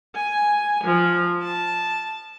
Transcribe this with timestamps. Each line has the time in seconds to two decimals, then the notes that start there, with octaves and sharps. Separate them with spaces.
0.17 G#5
0.84 F3
1.44 A5